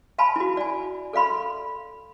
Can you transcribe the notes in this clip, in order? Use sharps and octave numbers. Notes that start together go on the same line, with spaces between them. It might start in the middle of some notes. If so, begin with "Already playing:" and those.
F5 G#5 A5 B5 C6
E4 F#4
D5 G#5
A4 D5 F5 B5 C6